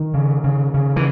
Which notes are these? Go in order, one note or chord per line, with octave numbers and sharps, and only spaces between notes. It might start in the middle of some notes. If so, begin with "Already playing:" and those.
Already playing: D#3
C#3
C#3
C#3
E3